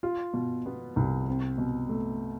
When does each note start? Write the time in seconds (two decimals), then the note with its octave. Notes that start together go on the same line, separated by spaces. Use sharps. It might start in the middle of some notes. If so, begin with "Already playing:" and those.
0.03 F4
0.34 B2
0.66 B3
0.96 C2
1.28 C4
1.58 B2
1.89 A3